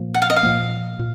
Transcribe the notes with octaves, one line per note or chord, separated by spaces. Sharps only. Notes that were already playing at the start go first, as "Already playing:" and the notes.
Already playing: A#2 F3 A#3
F#5
F5
D#5
F5
A#2 F3 A#3
A#2